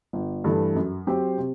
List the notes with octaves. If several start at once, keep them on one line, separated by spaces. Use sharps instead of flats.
G1
G2 E3 A3
F#2
F#3 C4 G4 C5
C3